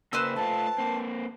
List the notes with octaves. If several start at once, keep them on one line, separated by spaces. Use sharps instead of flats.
C#3 A#3 B4 C5 E6
A3 E4 F4 A5
A#3 C4